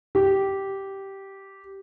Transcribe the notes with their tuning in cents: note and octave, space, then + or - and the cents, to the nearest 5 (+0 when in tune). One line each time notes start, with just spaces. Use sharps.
G4 -10